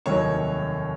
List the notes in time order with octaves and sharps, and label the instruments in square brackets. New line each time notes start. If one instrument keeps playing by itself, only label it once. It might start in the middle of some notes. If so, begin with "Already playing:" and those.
[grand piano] F1 D#2 D#3 F#3 C#5